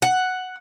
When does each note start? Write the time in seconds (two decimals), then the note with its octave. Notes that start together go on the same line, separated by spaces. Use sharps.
0.02 F#5